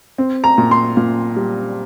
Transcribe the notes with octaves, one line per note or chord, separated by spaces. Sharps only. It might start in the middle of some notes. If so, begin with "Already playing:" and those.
C4
A#5
A#2
C6
A#2
G3